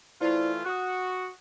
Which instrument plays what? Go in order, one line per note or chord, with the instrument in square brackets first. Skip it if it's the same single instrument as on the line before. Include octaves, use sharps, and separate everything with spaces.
[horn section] E3 A3 F4 [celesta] E4 C5 D5
[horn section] F#4 [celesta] D#6 F#6